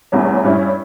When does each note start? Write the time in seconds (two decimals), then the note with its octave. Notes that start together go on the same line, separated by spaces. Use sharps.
0.12 F1 E2 C3 G3 C#4
0.43 G2 G3 C#4 E4